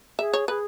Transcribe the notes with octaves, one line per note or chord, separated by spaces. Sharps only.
G#4 E5
C#5
G#4 B4